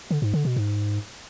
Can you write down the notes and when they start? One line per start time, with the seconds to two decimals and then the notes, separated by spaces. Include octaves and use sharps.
0.11 D3
0.22 G#2
0.33 D3
0.45 B2
0.56 G#2